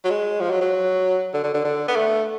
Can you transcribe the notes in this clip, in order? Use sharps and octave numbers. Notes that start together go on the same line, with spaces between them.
F#3
G#3
F3
F#3
F#3
D3
D3
D3
D3
B3
A3